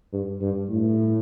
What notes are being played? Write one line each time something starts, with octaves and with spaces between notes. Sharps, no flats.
G2
G2
A2